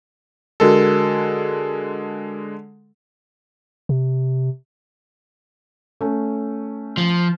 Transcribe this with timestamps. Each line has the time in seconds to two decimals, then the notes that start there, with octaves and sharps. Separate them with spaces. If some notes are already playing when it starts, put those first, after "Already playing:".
0.60 D3 G#3 F#4 A4 A#4
3.89 C3
6.01 A3 C#4
6.97 F3